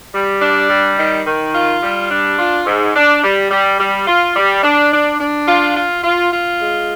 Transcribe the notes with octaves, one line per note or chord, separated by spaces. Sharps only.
G3
D4
G3
D#3
D#3
F4
G3
D4
F4
G#2
D4
G3
G3
G3
F4
G3
D4
D4
D4
F4
F4
F4
F4
G#3